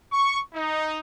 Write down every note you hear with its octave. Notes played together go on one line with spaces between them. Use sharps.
C#6
D#4